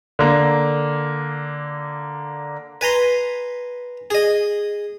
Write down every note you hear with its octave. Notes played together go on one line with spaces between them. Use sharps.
D3 A#3
B4 G#5 A#5 C6
G#4 D#5